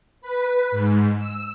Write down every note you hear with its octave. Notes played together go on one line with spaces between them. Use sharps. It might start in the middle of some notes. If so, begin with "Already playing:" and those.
B4
G#2
E6